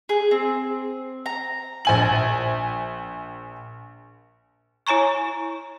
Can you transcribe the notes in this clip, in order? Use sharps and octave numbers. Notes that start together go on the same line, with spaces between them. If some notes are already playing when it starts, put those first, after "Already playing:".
G#4
C4
A#5
A#1 G#5 F#7
E4 C#5 G#5 A#5 C#6